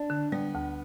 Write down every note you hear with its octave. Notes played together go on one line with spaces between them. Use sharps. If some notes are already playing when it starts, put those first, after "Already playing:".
Already playing: D4
D3
G3 B3
D2